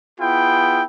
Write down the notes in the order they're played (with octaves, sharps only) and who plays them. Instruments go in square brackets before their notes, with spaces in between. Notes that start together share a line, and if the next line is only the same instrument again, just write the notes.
[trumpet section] B3 E4 F4 G#4 G5